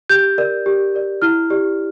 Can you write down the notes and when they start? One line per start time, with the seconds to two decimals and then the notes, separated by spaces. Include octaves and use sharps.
0.10 G4 G6
0.38 A#4 D5
0.66 G4
0.94 A#4 D5
1.22 E4 F6
1.50 G4 D5